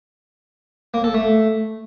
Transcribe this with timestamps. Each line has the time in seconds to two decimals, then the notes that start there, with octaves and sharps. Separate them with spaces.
0.94 A#3
1.04 A4
1.14 A3